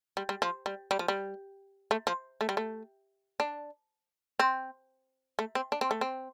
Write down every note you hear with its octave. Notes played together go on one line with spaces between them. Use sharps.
G3
G3
F3
G3
G3
F3
G3
A3
F3
A3
G3
A3
D4
C4
A3
C4
D4
C4
A3
C4